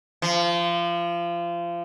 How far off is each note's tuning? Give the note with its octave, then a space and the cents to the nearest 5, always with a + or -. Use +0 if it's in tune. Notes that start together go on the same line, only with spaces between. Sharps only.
F3 -25